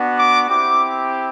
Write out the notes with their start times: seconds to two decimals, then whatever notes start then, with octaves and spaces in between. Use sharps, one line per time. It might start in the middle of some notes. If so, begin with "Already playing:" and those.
Already playing: B3 D4 F#4
0.17 D6
0.48 C4 E4 G4 D6